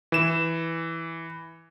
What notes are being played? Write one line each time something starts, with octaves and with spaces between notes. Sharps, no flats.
E3 E7